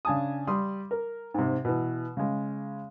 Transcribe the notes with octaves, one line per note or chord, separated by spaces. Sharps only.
C#3 D4 G#5 A5 D#6
G3 C6 D#6
A#4
G#2 C3
B2 E3
C#3 G#3